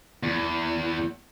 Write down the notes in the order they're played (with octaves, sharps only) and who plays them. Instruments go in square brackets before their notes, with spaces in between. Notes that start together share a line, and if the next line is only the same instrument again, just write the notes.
[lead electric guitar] E2